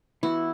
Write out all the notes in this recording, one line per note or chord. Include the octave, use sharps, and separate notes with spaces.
E3 B3 E4 F#4